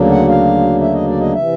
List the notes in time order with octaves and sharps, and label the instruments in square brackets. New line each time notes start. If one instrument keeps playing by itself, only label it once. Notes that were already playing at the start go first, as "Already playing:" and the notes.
Already playing: [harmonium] D2 C#3 F#3 A#3 D4
F#5
F5
E5
D#5
D5
D#5
C3 E3 E5